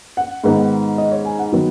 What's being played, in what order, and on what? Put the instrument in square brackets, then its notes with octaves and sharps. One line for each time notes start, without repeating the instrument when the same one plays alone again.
[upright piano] F#5
G#2 D#3 B3 D#4
D#5
C#5
G#5
F#5
D#3 F#3 B3